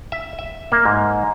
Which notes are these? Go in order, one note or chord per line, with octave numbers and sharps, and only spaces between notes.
E5
E5
A#3
G#2